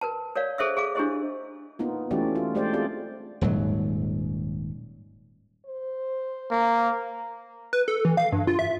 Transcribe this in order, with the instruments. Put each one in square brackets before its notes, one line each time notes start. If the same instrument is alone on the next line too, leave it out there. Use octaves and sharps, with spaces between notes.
[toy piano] A#4 B4 A5
A#4 C#5 D5 F5
G#4 A4 C5 E5 E6
G#4 A4 F5 D6
D4 E4 G4 G#4 C5 D#5
[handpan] A#3 B3 D#4 F4
E3 A3 C#4 F#4 G4 D5
F4
G#3 A3 D4 G4 C5 D5
C4 F4 G4 G#4 D5
[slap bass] D#1 G#2 F#3
[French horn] C5
[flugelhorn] A#3
[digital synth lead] B4
A4
E3
F5
G2
F4
E5